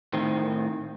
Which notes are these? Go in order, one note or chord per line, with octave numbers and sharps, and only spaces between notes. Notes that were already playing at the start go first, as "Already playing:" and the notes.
A2 D#3 C4